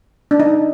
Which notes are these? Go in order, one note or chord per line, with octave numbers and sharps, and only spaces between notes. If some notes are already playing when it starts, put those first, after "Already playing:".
D4
D#4